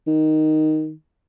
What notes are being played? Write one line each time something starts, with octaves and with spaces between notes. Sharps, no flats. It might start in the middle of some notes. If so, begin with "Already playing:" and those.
D#3